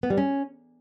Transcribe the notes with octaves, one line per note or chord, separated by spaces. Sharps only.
B3
G3
C#4